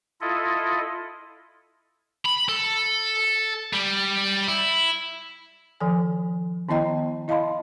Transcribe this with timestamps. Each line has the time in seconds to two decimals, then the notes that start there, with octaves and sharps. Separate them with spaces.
0.21 E4 F4 A4 D#5
2.25 B5
2.49 A4
3.73 G3
4.47 E4
5.80 D#3 F3 A4 G#5
6.69 D#3 B3 E4 D#5 G5 A#5
7.28 E4 D#5 F5 A5 B5 C6